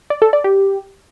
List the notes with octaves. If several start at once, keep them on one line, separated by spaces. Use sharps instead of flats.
D5
A4
D5
G4